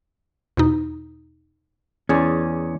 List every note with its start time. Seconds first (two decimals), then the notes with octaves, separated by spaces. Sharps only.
0.57 E2 B2 D#4
2.09 E2 C#4 G#4 D5